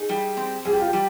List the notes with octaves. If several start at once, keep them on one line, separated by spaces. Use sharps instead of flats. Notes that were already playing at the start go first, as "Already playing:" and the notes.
Already playing: D#4 G#4
G3
C4
G3 G#4
G4
F4
G4
G3